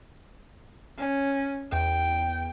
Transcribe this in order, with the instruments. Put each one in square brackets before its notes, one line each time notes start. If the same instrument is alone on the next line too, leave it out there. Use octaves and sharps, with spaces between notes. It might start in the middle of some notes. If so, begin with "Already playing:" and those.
[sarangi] C#4
[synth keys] E2 [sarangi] G5